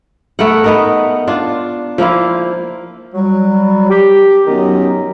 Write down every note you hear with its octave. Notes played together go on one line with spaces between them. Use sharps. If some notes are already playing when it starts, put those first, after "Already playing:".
A3 B3 A#4 F#5
B3 D#4 A#4
D4 F4
F3 A#3 E4 F4
F#3 G3
G4
F#2 D#3 F#3 B3 C#4 D#4